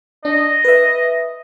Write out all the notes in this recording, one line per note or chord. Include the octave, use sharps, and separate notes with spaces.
D4 D#5
B4 E5